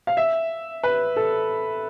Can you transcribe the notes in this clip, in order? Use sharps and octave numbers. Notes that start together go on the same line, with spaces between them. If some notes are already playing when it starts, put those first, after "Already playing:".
F5
E5
B4
A4